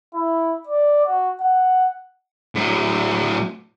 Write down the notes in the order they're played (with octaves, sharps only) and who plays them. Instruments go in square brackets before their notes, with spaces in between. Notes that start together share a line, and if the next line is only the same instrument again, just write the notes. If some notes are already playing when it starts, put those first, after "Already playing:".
[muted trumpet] E4
D5
F#4
F#5
[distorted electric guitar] A2 F#3